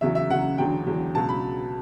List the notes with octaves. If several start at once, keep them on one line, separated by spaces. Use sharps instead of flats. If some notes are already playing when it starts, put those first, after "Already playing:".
E2 C#3 F#3 E5
E5
E2 C#3 F#3 F#5
E1 E2 D3 F#3 G5
E1 E2 D3 F#3
C#2 B2 F#3 A5
B5